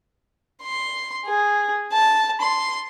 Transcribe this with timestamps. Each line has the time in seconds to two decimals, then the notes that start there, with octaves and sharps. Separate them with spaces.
0.63 C6
1.25 G#4
1.93 A5
2.41 C6